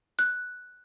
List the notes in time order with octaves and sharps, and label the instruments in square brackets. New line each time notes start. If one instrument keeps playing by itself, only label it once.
[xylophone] F#6